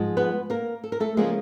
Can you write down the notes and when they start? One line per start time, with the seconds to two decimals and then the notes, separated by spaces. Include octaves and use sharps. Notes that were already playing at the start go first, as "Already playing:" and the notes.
Already playing: G#2 F3 G#3
0.17 B3 B4
0.50 A#3 A#4
0.84 A4
0.92 A#4
1.00 A3 A4
1.17 C#3 F3 G#3 A#3 G#4